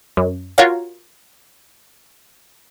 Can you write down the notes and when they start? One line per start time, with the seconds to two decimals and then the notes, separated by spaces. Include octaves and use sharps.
0.17 F#2
0.58 F4 F#4 A#4 C#5 F5